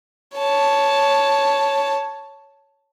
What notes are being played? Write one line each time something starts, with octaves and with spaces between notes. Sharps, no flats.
C#5 A5